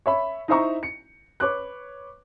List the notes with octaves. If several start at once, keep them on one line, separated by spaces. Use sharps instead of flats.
C#5 E5 B5
D#4 E4 C5 E5 A#5 C#6
C#7
B4 C#5 D6 F#6